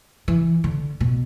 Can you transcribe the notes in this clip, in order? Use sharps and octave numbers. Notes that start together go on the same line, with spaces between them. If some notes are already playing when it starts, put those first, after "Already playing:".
E3
D3
B2